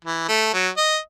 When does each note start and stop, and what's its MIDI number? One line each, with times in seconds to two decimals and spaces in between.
0.05 0.26 52
0.28 0.49 57
0.53 0.69 54
0.77 0.98 75